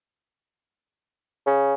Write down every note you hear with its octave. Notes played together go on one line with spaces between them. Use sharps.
C#3